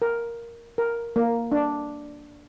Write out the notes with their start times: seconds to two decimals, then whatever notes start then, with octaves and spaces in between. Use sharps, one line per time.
0.02 A#4
0.78 A#4
1.16 A#3
1.52 D4